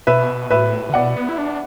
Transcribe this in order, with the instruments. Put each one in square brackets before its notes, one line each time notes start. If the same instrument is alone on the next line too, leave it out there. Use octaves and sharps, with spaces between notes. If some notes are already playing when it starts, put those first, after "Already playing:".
[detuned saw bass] B2 [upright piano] B4 E5
[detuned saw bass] A2 [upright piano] B4 E5
[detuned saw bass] D3
[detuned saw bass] B2 [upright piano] D5 F#5
[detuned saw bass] B3
E4
D4